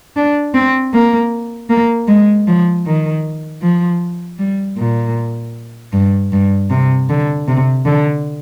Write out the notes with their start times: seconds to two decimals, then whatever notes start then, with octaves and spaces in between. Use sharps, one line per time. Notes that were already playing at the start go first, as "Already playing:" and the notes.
0.16 D4
0.54 C4
0.93 A#3
1.69 A#3
2.08 G#3
2.47 F3
2.86 D#3
3.62 F3
4.39 G3
4.78 A#2
5.93 G2
6.32 G2
6.70 C3
7.09 D3
7.47 C3
7.86 D3